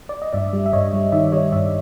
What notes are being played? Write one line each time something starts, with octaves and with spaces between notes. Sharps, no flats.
D5
D#5
G2 D5 E5
G3
E5
G2 C#5 D#5
G3
D#3 D5 E5
G3 C#5 D#5
G2 D5 E5